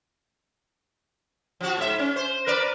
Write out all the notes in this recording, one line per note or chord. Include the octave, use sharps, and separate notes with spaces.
F3 F#4
G#2 E5
C#4
C5
A#4 B4 D5